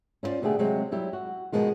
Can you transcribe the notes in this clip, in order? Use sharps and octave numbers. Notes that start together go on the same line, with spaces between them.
C#4 E4 F4 C5 D5
B2 D3 A3 G4 G#4
C3 F#3 G#3 C4 G4 C#5
F#3 G3 E4 G4
F#4
B2 D#3 F3 G#3 F4